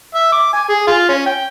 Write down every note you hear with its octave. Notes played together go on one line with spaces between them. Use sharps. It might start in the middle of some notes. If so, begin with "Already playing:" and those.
E5
D6
G#5
G#4
F4
C#4
G5